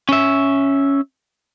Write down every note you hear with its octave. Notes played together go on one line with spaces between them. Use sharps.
C#4 E5